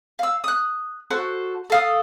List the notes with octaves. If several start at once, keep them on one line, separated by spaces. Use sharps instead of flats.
F5 E6
D#6 F#6
F#4 A4 C5
A4 F5 D#6